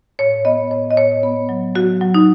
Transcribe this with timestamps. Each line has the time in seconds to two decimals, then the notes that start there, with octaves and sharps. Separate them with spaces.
0.19 A2 C#5
0.45 B3 D#5
0.71 A2 C#5
0.91 D#5
0.97 A2 C#5
1.23 B3
1.49 F#3
1.75 F#3 F#4
2.01 F#3
2.14 D#4